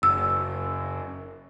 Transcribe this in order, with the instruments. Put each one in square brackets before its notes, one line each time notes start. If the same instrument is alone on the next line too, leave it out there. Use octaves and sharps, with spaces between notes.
[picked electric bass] F#1 [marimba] E6